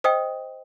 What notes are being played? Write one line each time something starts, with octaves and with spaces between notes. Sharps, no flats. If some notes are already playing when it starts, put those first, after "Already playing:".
C5 D#5 G5 D#6